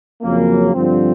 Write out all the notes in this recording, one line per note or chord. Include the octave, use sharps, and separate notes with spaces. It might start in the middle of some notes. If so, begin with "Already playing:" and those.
F2 C#3 F#3 A#3
G2 D3 F3 C4